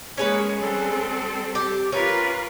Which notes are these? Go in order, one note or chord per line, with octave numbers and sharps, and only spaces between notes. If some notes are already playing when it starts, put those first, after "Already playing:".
G#3 A#3 C#4 G#4 B4 C#5
G3 C4 A4
G4
C#4 F4 A#4 B4